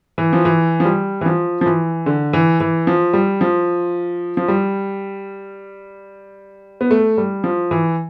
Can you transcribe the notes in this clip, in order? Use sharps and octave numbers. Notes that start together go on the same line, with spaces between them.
E3
F3
E3
F3
G3
E3
F3
F3
E3
D3
E3
E3
F3
G3
F3
F3
G3
B3
A3
G3
F3
E3